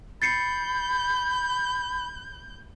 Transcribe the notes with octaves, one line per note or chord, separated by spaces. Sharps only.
B5 G6 A6 C7 C#7